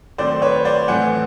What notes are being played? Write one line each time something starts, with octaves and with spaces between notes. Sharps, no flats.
D#3 F#3 A3 C4 C5 D5
B4 C#5
C5 D5
A2 E3 A3 C4 F#5 G#5